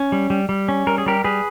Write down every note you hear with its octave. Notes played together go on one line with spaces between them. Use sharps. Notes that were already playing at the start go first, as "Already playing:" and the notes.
Already playing: C#4
G3
G3
G3
C#4
G3 A#4
G#4
G3 G4 A#4
G3 G#4 B4